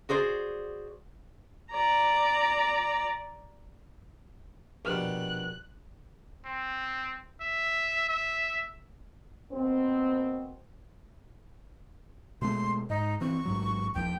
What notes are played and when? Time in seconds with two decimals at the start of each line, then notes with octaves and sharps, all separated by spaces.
0.09 F#4 G#4 C5 D5
1.71 D5 A#5
4.85 A#1 B2 G3 F#6
6.46 C4
7.41 E5
8.09 E5
9.51 B2 A#3 C4
12.42 B2 G#3 A3 C6
12.90 G#2 D#4
13.21 E3 C4 C#6
13.45 A1 G#2 F#3
13.94 D#1 D#2 F3 G5